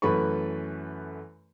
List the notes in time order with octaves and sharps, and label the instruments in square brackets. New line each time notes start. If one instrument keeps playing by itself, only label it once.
[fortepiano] F#2 E3 A3 B4 B5 C#6